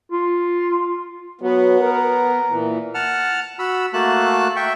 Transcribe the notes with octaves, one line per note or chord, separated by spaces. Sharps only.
F4
F#3 B3
A#4
A#2 E3
F#5 A5 F6
F#4 B5 E6
A3 A#3 F#4 A5 F#6
E5 G5 C#6